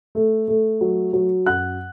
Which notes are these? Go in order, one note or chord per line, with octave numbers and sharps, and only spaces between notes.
A3
A3
F#3
F#3
F#2 F#5 F#6